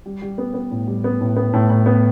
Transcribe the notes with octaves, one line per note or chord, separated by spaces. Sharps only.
G3
G3
B3
B3
A2
G3
B3
A2
B3
A2
A2
B3